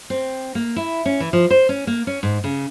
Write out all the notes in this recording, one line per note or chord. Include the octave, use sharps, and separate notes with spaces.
C4
A#3
E4
C#4
E3
F3
C5
C#4
A#3
C#4
G#2
C#3